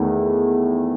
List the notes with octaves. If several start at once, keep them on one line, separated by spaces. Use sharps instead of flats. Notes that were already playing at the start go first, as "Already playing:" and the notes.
Already playing: E2 D#3 A3